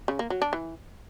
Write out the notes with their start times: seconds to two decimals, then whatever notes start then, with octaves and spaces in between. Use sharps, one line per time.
0.08 C#3
0.19 A#3
0.30 F#3
0.42 D4
0.53 E3